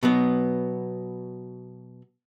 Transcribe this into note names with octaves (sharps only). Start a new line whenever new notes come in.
B2 F#3 B3